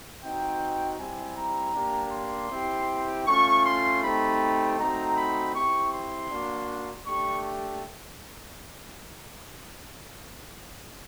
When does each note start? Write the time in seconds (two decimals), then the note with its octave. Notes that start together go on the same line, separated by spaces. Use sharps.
0.24 C4 D#4 F#4 G5
0.99 G3 C4 E4 G4 G#5
1.37 A#5
1.75 A#3 D4 G4
2.13 C6
2.51 C4 E4 G4
3.27 A3 C#4 F4 C#6
3.65 C6
4.03 A3 C4 D#4 G4 B5
4.79 A3 C4 D#4 F#4 A#5
5.17 B5
5.55 C4 E4 G4 C#6
5.93 C6
6.31 A#3 D4 F#4
7.07 A3 D4 G4 C#6